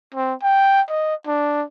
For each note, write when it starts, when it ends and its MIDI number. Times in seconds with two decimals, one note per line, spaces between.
0.14 0.34 60
0.43 0.81 79
0.89 1.14 75
1.26 1.64 62